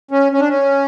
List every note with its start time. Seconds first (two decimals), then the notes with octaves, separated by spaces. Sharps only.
0.11 C#4
0.32 C#4
0.40 D4
0.48 C#4